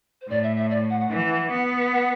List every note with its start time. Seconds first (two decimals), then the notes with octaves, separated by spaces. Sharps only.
0.21 C5
0.29 A2 D5
0.43 E5
0.56 E5
0.70 D5
0.90 F#5
1.01 F#5
1.10 E3
1.51 B3
1.93 F#5